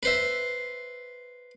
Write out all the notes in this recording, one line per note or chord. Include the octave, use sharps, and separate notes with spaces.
B4 C5 E5